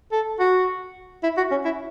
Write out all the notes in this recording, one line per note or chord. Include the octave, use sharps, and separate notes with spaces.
A4
F#4
E4
F#4
C#4
E4